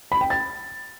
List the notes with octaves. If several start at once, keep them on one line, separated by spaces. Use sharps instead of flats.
B5
G5
A6